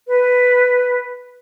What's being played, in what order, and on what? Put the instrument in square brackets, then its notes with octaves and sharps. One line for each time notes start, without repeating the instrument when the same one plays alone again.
[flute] B4